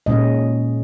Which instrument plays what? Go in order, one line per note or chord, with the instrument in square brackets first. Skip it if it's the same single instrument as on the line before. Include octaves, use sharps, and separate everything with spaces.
[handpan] A#2 G#3 C#4 D#5